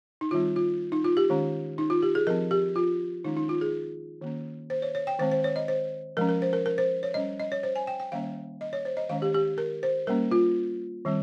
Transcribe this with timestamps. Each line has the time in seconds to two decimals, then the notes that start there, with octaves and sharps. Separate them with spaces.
0.21 D#4
0.31 D#3 G3 C4 F4
0.56 F4
0.92 D#4
1.04 F4
1.17 G4
1.30 D#3 G#3 C#4
1.78 D#4
1.90 F4
2.03 G4
2.15 G#4
2.27 F3 C4 A#4
2.51 G4
2.76 F4
3.24 D#3 G#3 C#4 D#4
3.37 D#4
3.49 F4
3.61 G#4
4.21 D#3 A#3 C#4
4.70 C5
4.82 C#5
4.95 C#5
5.07 G5
5.19 D#3 G#3 C4 C5
5.32 C5
5.44 C#5
5.56 D#5
5.68 C5
6.17 F3 G#3 C#4 A#4
6.29 A#4
6.42 C5
6.53 A#4
6.66 A#4
6.78 C5
7.03 C#5
7.14 G3 C#4 D#5
7.39 D#5
7.52 C#5
7.63 C5
7.76 G#5
7.87 G5
8.00 G5
8.12 D#3 G3 A#3 C#4 F5
8.61 D#5
8.73 C#5
8.85 C5
8.97 D#5
9.09 D#3 G#3 C#4 F5
9.22 G4
9.35 G4
9.58 A#4
9.83 C5
10.07 G3 A#3 C#4 A#4
10.31 F4
11.05 D#3 G3 C4